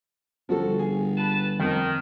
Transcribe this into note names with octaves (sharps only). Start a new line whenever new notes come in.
G1 F3 F#4 A4
G#4
B4 A5
F2 D#3